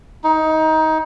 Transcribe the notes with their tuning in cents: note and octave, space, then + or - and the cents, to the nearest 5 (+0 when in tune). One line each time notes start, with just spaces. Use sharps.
D#4 +20